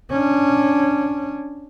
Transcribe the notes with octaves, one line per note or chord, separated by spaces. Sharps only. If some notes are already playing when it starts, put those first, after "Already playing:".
C#4 D4